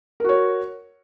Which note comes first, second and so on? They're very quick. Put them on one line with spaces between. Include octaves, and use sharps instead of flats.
A#4 F#4 C#5